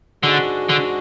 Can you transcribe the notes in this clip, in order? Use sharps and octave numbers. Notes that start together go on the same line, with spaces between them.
G#2 D3 G#3 D4 F#4
D3